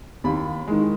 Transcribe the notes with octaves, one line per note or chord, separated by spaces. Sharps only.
D#2 B5
D#3 G#3